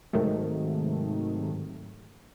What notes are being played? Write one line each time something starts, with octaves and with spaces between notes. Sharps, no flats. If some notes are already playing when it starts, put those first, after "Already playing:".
G#2 C3 D#3 F#3 A3